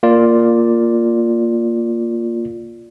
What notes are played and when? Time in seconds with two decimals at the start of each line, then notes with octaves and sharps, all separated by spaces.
0.03 A#3 F4 D5